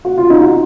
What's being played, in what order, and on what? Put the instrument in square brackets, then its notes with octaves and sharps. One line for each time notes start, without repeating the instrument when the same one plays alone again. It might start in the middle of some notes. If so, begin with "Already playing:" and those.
[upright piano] F#4
F4
D#4
F#4